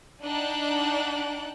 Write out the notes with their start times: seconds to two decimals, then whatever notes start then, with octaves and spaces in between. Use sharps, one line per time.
0.23 D4 D#4 F#5 G5 A5 F#6